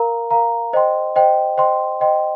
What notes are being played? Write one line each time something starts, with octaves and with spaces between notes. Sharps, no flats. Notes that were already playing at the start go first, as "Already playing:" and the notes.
Already playing: A#4 F5 A#5
A#4 F5 A#5
C5 D#5 G5 C6
C5 D#5 G5 C6
C5 D#5 G5 C6
C5 D#5 G5 C6